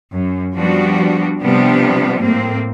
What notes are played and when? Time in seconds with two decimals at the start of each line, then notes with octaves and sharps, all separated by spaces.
0.14 F#2
0.55 F3 G3 B3 D4 F#4
1.43 C3 F3 G3 B3 D4
2.22 A2 A#3 C4